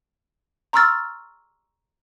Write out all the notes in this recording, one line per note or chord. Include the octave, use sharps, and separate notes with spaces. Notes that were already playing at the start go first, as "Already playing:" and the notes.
A#5 C6 C#6 E6 F6 A6